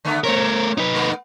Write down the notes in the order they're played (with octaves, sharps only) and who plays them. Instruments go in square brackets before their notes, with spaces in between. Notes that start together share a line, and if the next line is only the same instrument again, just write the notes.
[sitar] D3 A3 B3
[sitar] A#2 C4 C#5 [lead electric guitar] A3 A#4
[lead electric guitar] D#4 B4
[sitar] A3 B3